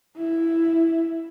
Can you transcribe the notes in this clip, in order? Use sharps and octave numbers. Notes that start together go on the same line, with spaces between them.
E4